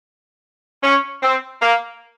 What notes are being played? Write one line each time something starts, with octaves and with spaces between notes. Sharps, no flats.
C#4
C4
A#3